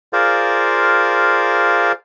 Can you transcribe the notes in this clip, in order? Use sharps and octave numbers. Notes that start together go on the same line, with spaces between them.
F4 G#4 A#4 C5 D5 F5